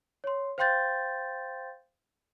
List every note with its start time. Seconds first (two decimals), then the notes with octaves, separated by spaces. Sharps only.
0.24 C#5 C6
0.58 C5 F5 G5 C6 G6 A6